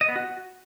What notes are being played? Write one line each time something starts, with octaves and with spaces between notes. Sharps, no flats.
D#5
B3
F#4